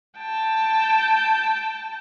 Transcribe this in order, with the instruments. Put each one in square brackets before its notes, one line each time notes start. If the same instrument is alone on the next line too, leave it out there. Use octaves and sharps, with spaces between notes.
[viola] G5 A5